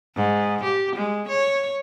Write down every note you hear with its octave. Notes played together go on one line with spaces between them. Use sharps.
G#2
G4
G#3
C#5